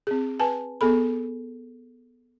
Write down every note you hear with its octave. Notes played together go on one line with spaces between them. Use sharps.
C4 G#4
B4 G#5 A5
B3 G#4 A4 B5